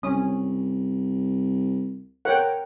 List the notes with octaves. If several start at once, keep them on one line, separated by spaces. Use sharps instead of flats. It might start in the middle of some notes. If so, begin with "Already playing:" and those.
C2 C#4 D#6
A#4 C#5 F#5 G5